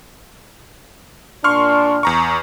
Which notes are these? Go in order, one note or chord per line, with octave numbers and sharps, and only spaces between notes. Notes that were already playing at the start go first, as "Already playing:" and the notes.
A#2 D4 C6 C#6 F6
E2 A#5 C#6